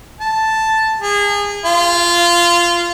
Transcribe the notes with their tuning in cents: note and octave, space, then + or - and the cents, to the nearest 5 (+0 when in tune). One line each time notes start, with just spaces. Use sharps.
A5 +0
G#4 -30
F4 -15